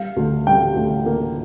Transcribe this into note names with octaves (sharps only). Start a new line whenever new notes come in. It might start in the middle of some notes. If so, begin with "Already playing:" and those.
Already playing: G3 F5
D2
G3 G5
D2
A#3